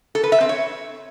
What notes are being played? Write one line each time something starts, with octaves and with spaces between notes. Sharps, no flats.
A4
B4
E5
C4
C#5